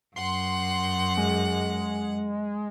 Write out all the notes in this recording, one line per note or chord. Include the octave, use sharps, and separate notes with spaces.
F#2 F#5 C6
G#3